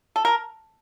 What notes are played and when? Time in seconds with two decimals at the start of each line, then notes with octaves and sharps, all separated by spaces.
0.16 A4
0.25 A#4